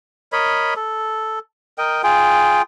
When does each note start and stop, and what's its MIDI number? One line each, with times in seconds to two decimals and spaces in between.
0.32 0.74 70
0.32 0.74 73
0.32 0.74 75
0.32 0.74 83
0.76 1.39 69
1.78 2.02 70
1.78 2.02 75
1.78 2.02 79
2.03 2.62 65
2.03 2.62 68
2.03 2.62 79